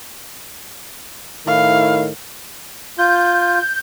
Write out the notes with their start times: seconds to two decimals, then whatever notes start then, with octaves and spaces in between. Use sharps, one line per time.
1.47 A2 D#3 E4 F5
2.98 F4 G6